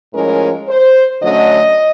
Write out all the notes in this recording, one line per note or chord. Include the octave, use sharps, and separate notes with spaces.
A2 F3 G#3 C#4 A#4
C5
D3 F#3 A3 C#4 D#5